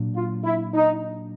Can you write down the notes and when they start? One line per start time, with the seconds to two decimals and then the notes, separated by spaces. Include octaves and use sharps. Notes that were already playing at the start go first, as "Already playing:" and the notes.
Already playing: A#2 F#3 A#3 D4
0.15 F4
0.44 E4
0.74 D#4